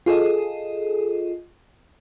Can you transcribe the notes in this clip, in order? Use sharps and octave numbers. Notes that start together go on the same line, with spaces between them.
F4 G#4 A4 D#5